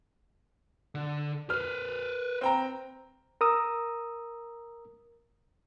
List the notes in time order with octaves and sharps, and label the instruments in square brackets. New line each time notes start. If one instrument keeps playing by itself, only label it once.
[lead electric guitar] D3
[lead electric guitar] B4 C5 [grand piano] F6
[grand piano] C4 G5 A#5
[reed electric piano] A#4 A#5 D#6 E6